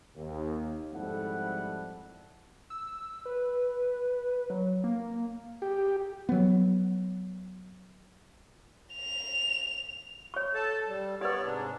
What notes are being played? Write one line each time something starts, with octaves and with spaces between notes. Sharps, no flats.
D#2
F2 G#2 G3 E4 A4 F#5
E6
B4
F#3
A#3
G4
F#3 B3
F7
C#5 C#6
A4 A5
G3
B3 G4 B4 C#5 D5
G#2 C3 D4